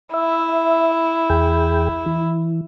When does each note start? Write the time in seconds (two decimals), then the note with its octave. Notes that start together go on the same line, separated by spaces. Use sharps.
0.14 E4 E5
1.30 E2 G#4 G5
2.06 E3